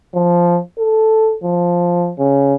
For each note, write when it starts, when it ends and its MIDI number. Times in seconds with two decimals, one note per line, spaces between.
0.15 0.60 53
0.79 1.36 69
1.44 2.12 53
2.19 2.55 49